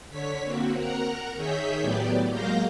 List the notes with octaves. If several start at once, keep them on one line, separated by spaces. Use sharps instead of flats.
D3 C#5 B6
A#3 C4 F#4
A#4 F#5 A#5
D#3 G#4 C#5 E5 G6 B6
A2 F#3 B3 G4 D5
F#3 G#3 A#3 F5 G6 A#6